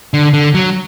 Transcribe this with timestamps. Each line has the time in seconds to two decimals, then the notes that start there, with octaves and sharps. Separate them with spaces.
0.14 D3
0.34 D3
0.54 F#3